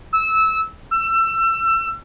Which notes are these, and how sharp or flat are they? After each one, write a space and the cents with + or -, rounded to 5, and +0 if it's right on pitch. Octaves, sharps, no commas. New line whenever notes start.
E6 -20
E6 +25